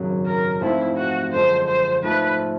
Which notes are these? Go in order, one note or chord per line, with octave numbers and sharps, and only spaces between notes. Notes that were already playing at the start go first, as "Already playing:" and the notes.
Already playing: G#1 F#2 C#3 F#3
A#4
G#2 F3 A3 C4 E4 F4
F#4
G1 F#2 D3 F3 G#3 C5
C5
G#2 F3 A3 B4